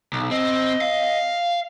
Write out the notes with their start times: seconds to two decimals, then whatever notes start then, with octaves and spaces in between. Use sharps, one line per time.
0.13 B1
0.31 C4 D#5
0.81 F5